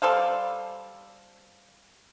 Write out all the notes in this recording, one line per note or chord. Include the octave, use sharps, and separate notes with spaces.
G3 A4 C5 F5